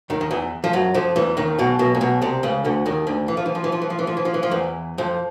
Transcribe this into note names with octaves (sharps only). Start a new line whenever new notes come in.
D#2 D#3
D#3
E2 E3
F3
F#2 F#3
F2 F3
E2 E3
D#2 D#3
B1 B2
B1 B2
A#2
B1 B2
C2 C3
C#2 C#3
D2 D3
D#2 D#3
D2 D3
E3
F3
E3
F3
E3
F3
E3
F3
E3
F3
E3
F3
E3
F3
E2 E3
F2 F3